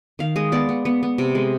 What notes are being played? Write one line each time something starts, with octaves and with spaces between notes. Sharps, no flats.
D#3 F5
G#3 D#5
B3 D5
B3
B3
B3
C3
G#3